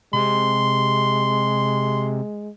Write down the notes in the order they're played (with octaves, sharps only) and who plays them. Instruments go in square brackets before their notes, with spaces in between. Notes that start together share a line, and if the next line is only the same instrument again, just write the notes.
[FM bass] C3 [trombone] G#3 [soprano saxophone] C6